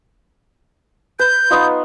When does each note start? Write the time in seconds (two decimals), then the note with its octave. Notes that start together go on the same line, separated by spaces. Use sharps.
1.19 B4 G6
1.50 B3 D#4 F4